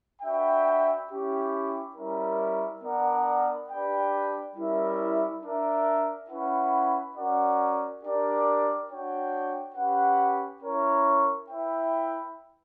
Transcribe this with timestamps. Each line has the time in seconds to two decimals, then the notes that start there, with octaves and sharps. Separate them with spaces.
0.22 D4 F#4 B4 E5 G5
1.08 C#4 E4 G4
1.95 G3 C#4 E4 A#4
2.81 B3 D4 A#4 D5 F#5
3.69 D4 G4 B4 D5 G5
4.55 G3 C#4 E4 A#4 E5
5.41 D4 A#4 E5
6.28 C#4 E4 B4 F#5
7.15 C#4 F#4 A#4 D5 F#5
8.02 D4 G4 A#4 D5
8.88 D4 F#4 C#5 G5
9.75 C#4 G4 B4 F#5
10.61 C#4 E4 A#4 C#5
11.48 E4 B4 E5 G5